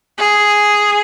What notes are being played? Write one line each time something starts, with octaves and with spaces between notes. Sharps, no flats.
G#4